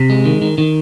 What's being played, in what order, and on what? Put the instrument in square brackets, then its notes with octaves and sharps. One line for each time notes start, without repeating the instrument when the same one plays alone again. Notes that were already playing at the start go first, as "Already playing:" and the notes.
Already playing: [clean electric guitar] C3
G#3
D#3
D#3
D#3